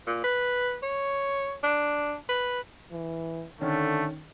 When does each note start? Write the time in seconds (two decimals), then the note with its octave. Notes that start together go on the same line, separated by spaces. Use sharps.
0.07 A#2
0.24 B4
0.83 C#5
1.63 D4
2.29 B4
2.92 E3
3.61 D3 D#3 A3 C#4